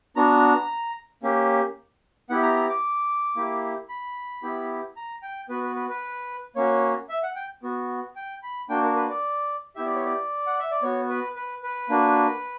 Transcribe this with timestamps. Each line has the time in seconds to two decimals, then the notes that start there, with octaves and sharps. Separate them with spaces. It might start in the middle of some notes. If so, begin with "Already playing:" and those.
0.16 B3 D4 F#4 A#5
1.23 A#3 C#4 G4
2.29 B3 E4 G4 F#5
2.43 A#5
2.56 A#5
2.69 D6
3.36 A#3 E4 G4
3.89 B5
4.43 B3 E4 G4
4.96 A#5
5.22 G5
5.49 B3 F#4 B4
5.63 B4
5.76 B4
5.89 B4
6.56 A#3 C#4 F#4 C#5
7.09 E5
7.23 F#5
7.36 G5
7.63 B3 F#4
8.16 G5
8.43 B5
8.69 A#3 D4 F#4 G5
8.82 A#4
8.96 B4
9.09 D5
9.76 B3 E4 G4 E5
9.86 D5
9.95 C#5
10.05 D5
10.46 F#5
10.59 E5
10.71 D5
10.82 B3 F#4 C#5
11.09 B4
11.36 B4
11.63 B4
11.89 A#3 D4 F#4